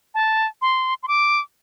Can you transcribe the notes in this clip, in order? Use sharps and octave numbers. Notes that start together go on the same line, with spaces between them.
A5
C6
C6
D6